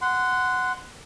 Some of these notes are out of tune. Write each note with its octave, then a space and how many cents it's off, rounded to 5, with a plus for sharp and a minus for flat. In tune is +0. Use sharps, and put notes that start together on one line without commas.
F#5 +0 C6 -25